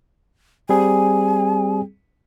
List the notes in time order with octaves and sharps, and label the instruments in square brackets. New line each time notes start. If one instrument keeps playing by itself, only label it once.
[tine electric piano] G3 C4 G#4 [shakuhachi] G#5